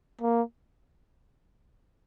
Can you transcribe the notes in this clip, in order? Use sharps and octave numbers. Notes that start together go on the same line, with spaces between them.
A#3